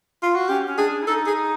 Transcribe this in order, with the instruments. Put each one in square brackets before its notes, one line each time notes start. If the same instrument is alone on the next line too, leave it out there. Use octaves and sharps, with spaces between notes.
[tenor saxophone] F4
F#4
[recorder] C#4 [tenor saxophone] G4
[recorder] C#4
[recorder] D4 [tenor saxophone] G#4
[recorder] E4
[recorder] D#4 [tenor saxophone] A4
[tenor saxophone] G#4